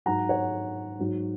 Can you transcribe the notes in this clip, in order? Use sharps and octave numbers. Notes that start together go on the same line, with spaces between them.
G#2 F#3 F#5 A#5
C#5 F#5
G#2 F#3